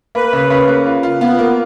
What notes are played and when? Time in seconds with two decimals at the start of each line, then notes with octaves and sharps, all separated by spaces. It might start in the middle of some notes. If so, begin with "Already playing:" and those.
0.15 A#3 B4
0.33 C#3
0.50 C#3
0.68 A#3
0.86 F4
1.03 F4
1.20 B3 F4
1.39 A#3